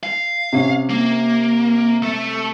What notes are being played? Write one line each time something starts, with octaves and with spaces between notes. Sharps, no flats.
F5
C3 C#4
A#3
A3